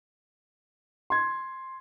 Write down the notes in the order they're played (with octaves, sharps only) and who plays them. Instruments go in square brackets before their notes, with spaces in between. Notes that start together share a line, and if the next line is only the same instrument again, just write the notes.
[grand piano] C6 G#6